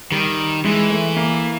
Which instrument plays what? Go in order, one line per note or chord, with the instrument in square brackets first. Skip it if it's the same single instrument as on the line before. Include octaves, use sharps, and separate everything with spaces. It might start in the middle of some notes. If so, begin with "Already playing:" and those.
[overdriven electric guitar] D#3 [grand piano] G3
[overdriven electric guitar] E3 [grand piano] G#3
[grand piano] A3
A#3